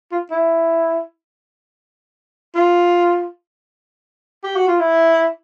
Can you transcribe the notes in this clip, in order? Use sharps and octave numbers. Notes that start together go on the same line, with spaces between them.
F4
E4
F4
G4
F#4
F4
E4